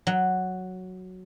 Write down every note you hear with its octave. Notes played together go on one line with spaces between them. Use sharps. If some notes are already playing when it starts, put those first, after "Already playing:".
F#3